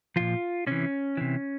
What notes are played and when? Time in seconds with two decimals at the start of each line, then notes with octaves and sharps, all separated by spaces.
0.16 A#2 F3 F4
0.67 C3 E3 C#4
1.17 C3 E3